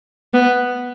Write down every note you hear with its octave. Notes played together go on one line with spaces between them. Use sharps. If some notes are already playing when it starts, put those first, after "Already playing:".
B3